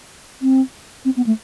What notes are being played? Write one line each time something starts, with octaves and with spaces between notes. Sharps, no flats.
C4
C4
B3
A3